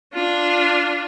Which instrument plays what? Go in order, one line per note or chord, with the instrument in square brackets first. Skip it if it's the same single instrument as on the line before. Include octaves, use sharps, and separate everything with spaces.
[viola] D4 F4